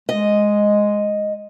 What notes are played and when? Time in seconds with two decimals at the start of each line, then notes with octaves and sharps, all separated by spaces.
0.09 G#3 D#5